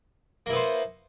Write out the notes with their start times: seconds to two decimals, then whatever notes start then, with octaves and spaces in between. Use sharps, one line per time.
0.46 A#3
0.49 E4
0.53 B3
0.56 C5